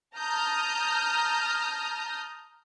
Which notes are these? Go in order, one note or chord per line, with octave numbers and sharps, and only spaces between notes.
A5 A#5 D#6 F6 G6